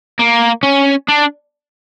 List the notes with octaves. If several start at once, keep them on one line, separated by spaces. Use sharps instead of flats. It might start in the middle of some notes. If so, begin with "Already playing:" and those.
A#3
C#4
D4